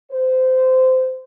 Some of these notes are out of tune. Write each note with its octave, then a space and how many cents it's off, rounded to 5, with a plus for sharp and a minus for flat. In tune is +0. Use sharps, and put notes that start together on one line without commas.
C5 -20